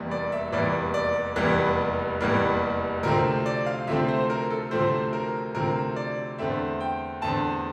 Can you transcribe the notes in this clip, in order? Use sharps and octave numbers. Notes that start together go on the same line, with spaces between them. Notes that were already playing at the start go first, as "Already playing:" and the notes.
Already playing: F1 E2 E3 G3 A#3
D5
E5
F1 E2 E3 G3 A#3 D5
D5
F1 E2 E3 G3 A#3
F1 E2 E3 G3 A#3
D2 C3 F3 A3 C4 A#4
D5
F5
D2 C3 F3 A3 C4 E5
C5
A#4
A4
D2 C3 F3 A3 C4 C5
A#4
D2 C3 F3 A3 C4 A#4
D5
E2 D3 A3 C4 E5
G5
E2 D3 A3 C4 A5